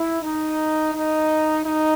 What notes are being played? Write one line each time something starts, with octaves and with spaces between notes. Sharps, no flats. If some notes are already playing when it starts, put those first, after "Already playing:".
Already playing: E4
D#4
D#4
D#4